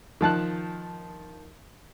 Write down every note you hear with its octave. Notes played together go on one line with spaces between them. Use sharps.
D#3 F3 A5 F#6